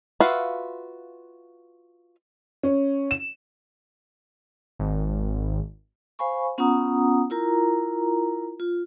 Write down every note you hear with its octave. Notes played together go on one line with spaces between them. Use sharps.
F4 F#4 B4 E5 F5
C#4
E7
G#1
C5 F5 G#5 B5 C#6
B3 C#4 F4 F#5 A#5 D#6
E4 F4 A#4 A#5
F4